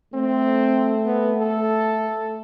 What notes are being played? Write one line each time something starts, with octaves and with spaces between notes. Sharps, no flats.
A3 C4
B3
A4